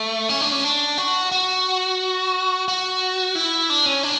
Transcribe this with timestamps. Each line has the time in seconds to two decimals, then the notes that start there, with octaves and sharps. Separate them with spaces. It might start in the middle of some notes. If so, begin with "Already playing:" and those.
Already playing: A3
0.29 C#4
0.41 D4
0.52 C#4
0.64 D4
0.98 F#4
1.32 F#4
2.68 F#4
3.35 E4
3.70 D4
3.86 C#4
4.03 D4